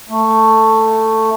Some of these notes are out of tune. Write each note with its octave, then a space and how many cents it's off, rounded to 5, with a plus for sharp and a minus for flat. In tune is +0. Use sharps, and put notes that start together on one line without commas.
A3 +10